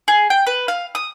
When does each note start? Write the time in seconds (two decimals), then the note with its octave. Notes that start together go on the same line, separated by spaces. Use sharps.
0.08 G#4
0.30 G5
0.46 B4
0.68 F5
0.95 D#6